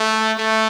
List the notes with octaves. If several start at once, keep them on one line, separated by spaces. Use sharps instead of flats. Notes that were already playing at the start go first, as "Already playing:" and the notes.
Already playing: A3
A3